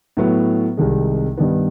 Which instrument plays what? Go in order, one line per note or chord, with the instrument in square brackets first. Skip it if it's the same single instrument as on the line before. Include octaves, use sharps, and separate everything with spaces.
[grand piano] A2 F#3 B3
C2 C3 D#3 G#3
G2 D#3 G3 B3